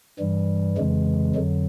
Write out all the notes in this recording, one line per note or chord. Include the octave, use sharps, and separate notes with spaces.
G2 E3 G3
F2 C#3 E3 G#3
F2 D3 F#3